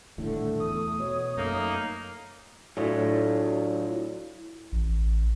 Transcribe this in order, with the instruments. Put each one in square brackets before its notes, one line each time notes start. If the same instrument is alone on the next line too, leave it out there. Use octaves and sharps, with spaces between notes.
[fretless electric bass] D#1 A2 D3 [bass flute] A3
[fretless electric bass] E2 [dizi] D#6
[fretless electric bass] B2 [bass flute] C#5
[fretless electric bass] F#2 A3 [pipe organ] A#3 D#4
[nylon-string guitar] A2 [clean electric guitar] F#3 D4 F4
[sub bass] A1